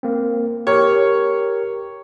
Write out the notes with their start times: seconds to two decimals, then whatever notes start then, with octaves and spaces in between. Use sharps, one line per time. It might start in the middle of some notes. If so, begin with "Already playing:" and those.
0.03 A#3 C4
0.67 G4 A#4 C#5